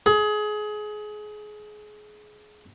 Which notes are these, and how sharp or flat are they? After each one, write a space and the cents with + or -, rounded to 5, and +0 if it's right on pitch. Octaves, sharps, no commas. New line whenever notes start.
G#4 +25